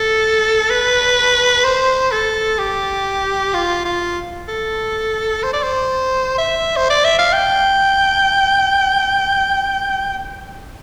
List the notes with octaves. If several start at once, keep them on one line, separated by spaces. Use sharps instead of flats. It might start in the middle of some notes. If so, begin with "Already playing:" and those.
Already playing: A4
B4
C5
A4
G4
F4
F4
A4
C5
D5
C5
E5
C5
D5
E5
F5
G5